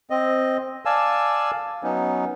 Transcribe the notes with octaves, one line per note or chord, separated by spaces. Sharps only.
C4 D#5
D5 F5 G#5 A5 E6
F#3 B3 C#4 D#4